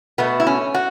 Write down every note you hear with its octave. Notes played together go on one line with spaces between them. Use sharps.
B2 A3 B3
E4
C#4
F#4